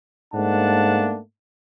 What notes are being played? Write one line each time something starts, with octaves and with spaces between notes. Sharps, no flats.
G#2 A3 A#3 D4 F#5 A5